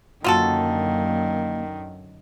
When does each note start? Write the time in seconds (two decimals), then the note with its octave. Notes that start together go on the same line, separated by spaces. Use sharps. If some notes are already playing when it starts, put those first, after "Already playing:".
0.24 F#2 D3 D#3 A#3 F4 F#4 A4